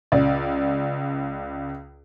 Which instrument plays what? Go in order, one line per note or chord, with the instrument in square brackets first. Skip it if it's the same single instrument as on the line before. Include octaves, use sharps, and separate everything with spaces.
[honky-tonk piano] C#2 D5